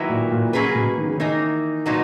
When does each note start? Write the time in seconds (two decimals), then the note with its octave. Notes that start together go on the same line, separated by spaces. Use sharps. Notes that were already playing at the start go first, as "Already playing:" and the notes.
Already playing: D#3 F#3 A#3 E4 B4
0.09 A#2
0.31 A#2
0.53 C#3 F#3 A#3 C#4 G#4 B4
0.75 B2
0.97 D#3
1.07 C#3
1.17 D#3 E3 A#3 D#4
1.86 A#2 F#3 B3 D#4